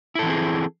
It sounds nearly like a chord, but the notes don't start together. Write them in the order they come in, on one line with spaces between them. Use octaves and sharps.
E4 A4 E3 C4 G#4